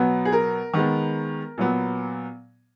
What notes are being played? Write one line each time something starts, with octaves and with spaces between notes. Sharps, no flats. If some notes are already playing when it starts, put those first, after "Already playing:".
Already playing: B2 F#3 B3
G#4
A#4
D#3 G#3 B3
A#2 F#3 B3